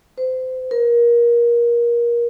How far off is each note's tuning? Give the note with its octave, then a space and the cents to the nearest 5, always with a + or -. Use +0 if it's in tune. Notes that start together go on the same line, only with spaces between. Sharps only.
C5 -25
A#4 +25